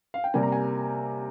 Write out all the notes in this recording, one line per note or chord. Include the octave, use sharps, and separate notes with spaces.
F5
G5
C3 G3 A#3 G#5
A#5
G#5